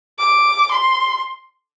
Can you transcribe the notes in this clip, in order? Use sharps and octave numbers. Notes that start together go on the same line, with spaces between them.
D6
C6